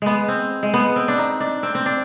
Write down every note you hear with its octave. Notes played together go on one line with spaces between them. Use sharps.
G#3 B3
C4
G#3
B3
C4
D4
D#4
D4
C4
C4
D4